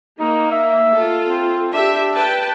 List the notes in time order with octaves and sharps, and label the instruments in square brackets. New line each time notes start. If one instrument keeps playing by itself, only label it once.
[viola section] A#3 [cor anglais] D#4
[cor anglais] E5
[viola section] F4 A4
[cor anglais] C4
[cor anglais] D4 [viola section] G4 E5
[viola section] B4 G5 A5